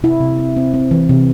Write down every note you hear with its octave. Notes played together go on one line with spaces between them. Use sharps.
C3 E4
C3
C4
C4
C4
E3
C3